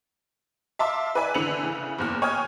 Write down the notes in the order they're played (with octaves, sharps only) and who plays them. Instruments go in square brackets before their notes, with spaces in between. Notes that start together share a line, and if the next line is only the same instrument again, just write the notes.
[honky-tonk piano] E5 F5 A5 C6 D6
B4 D5 E5 G#5 B5
D3 E3 B4 C#7 F7 F#7
C#3 E3
F#1 E2 F6
C#5 G5 G#5 D#6 F6 G#6